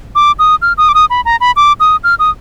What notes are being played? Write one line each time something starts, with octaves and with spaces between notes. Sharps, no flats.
D6
D#6
F6
D#6
D6
D#6
B5
A#5
B5
D6
D#6
F6
D#6